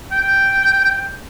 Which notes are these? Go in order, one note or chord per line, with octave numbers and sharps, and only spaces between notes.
G5